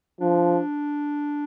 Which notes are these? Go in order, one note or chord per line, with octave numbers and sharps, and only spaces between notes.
F3 D4